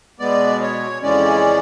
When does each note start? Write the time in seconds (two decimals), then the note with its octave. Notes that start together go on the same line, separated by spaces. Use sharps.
0.19 B2 G#3 B3 D5
0.61 C#5
1.02 F2 C#3 E3 G#3 C#4 D5